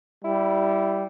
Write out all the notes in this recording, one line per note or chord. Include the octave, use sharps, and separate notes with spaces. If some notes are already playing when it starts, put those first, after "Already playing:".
G3 E4